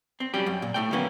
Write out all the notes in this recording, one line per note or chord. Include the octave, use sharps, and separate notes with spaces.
C4
F#3 G3 C#4 G4
F#2
A#2
A2 A3 G5
D3 F#3 A#3 B3 C#4